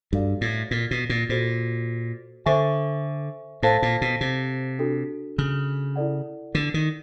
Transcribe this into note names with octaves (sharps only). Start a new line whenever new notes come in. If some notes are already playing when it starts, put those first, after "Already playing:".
G2 F#4 A4 D5 F5
A2
A#2
B2
A#2
A#2 F#4 A4 C5
D3 A4 C5 E5 G#5 C#6
A2 A4 C5 F5 A5
A#2
B2
C3
D4 F#4 A4
C#3
E4 A4 D5 F#5
D3
D#3